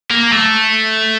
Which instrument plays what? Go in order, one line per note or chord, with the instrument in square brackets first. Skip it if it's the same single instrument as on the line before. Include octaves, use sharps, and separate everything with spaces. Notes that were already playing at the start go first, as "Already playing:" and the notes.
[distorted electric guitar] A#3
A3